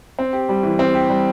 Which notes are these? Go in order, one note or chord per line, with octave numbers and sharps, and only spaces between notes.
C4
G4
G3
E3
C4
G4
G3